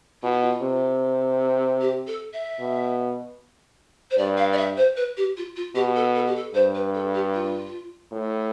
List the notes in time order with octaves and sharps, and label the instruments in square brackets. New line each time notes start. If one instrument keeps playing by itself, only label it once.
[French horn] B2 [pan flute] F4
[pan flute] E4
F4
[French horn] C3
[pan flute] G4
A4
E5
[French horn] B2
[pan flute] C5
[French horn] G2 [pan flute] D5
[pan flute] F5
D5
E5
C5
B4
G4
F4
F4
[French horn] B2 [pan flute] G4
[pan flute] A4
A4
G4
A4
[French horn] G2 [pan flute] C5
[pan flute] B4
A4
G4
F4
[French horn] A2